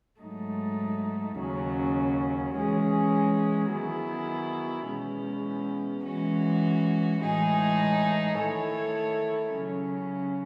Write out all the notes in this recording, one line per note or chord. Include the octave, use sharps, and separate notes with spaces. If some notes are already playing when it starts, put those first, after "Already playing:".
G#2 F#3 A3 D#4
D#2 C#3 F#3 C#4
E3 G#3 C#4 G#4
D#3 F#3 B3 E4 G#4
E2 B2 G#3 C#4
E3 G#3 C#4 F#4
A2 E3 G#3 D#4 G#4
D#3 A3 E4 A4 C#5
C#3 F#3 C#4